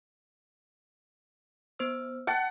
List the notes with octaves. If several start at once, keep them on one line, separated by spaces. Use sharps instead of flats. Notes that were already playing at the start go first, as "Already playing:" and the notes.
B3 C5 E6
F#5 G5 A5 A6